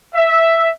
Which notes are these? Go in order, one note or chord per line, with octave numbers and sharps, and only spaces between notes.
E5